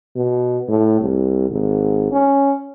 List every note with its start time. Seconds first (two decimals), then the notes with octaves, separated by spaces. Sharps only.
0.16 B2
0.69 A2
1.00 C2
1.50 G#1
2.12 C#4